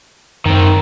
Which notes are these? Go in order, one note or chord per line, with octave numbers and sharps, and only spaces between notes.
F#2 D#3 C4